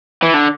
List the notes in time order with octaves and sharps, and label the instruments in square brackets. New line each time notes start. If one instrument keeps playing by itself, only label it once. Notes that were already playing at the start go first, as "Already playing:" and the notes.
[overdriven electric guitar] E3
D3